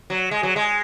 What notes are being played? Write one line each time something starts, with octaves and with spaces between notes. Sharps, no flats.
F#3
G#3
F#3
G#3